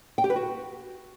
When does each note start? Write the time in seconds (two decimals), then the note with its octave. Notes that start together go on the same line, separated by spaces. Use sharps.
0.18 G5
0.24 G4
0.30 B4
0.36 F#4